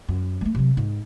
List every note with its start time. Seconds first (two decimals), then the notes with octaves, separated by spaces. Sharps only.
0.08 F#2
0.41 G3 A3
0.55 C3 F#3
0.77 G#2